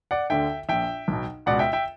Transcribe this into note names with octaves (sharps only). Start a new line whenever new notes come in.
D5 F#5
D2 D3 E5 G5
A#1 A#2 E5 G5
B1 B2
C#2 B2 D5 F#5
E5 G5
E5 G5